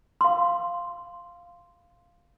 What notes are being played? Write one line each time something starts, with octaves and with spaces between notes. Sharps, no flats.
F5 C6